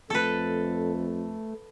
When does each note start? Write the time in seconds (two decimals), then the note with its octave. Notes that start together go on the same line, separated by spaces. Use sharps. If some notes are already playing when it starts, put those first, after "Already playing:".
0.10 F2 A3 A4 B4